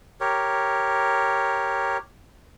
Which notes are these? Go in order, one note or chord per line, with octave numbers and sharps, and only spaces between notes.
G4 A#4 C#5